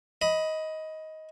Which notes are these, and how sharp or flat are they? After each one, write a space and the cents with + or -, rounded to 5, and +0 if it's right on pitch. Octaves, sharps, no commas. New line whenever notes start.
D#5 +15 B5 +0